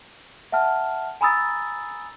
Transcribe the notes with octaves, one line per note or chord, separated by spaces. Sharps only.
E5 F#5 A5 F6
G#5 A#5 B5 D#6 E6 A6